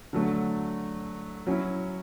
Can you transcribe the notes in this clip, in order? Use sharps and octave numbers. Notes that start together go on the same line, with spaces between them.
D3 F#3 A3
F#3 C#4 E4